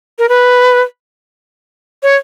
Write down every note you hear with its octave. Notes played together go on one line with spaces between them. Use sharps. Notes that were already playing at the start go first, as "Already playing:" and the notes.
A#4
B4
C#5